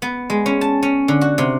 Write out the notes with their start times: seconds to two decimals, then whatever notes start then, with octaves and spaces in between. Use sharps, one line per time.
0.02 B3
0.30 G#3
0.46 C#4
0.61 A5
0.83 C#4
1.08 D3
1.21 F#4
1.38 C3